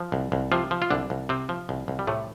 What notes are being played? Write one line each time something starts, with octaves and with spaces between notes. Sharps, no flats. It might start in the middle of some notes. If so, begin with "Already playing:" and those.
Already playing: F3
C2
C2
C3 F3 F4
F3
F4
C2 D3 D4
C2
C3 C4
F3
C2
C2
G3
A2 C3 A3